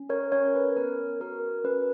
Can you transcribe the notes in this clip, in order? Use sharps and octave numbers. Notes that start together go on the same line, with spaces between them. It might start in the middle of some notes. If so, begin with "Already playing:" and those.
Already playing: C#4
A#4 C#5
C#4 A#4 C#5
B4
B3 A#4
F#4 A#4
C#4 B4